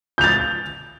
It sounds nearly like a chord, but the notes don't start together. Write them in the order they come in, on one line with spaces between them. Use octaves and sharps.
G6 F7 A6